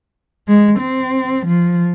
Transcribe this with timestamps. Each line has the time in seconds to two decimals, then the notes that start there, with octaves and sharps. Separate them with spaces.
0.48 G#3
0.79 C4
1.46 F3